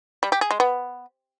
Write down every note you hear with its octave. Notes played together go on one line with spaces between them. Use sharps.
G3
G4
G#4
G#3
B3